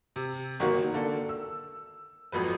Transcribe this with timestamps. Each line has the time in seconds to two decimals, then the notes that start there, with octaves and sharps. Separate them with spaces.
0.16 C3
0.60 G1 D#3 F#3 A#3 F#4 C#6
0.94 D3 A#3 A4
1.29 E6
2.32 G#1 F2 F#3 B4